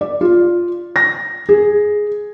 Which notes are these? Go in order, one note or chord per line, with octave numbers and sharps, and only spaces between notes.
D5
F4
A#6
G#4